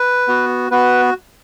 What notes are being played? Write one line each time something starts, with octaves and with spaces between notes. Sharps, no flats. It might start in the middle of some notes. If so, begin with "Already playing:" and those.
Already playing: B4
B3 F#4
B3 F#4 B4